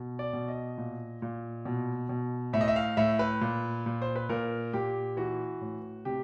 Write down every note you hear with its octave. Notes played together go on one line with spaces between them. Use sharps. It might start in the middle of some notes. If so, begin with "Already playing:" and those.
Already playing: B2
D5
B2
D#5
A#2
A#2
B2
B2
A2 E5
D#5
E5
F5
A2 E5
B4
A#2
A#2
C5
B4
A#2 A#4
A#2 G4
E3 F#4
A2
C3 G4